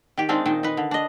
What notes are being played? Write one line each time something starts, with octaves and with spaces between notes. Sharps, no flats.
D#3 G4
G#3 C4 D4 D#4 F5
A#2 D#3 D#4 C5
D#4 B4
D3
D4 D#5